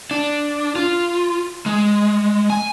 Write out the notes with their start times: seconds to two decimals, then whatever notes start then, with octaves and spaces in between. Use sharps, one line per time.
0.11 D4
0.76 F4
1.66 G#3
2.50 G#5